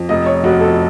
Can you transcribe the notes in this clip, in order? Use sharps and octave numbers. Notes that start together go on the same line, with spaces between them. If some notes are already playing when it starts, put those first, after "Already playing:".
Already playing: F2
F1 D#5
C#5
F1 F#4
A4